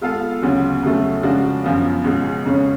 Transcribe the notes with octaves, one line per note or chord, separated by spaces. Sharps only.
G#3 B3 F4 A4 F5
D2 C#3 F#3 B3
F2 C#3 F#3 A3
C#3 F3 G#3 D4 F#4
F#2 F3 B3
C#2 B2 G#3
F2 C#3 G#3 C#4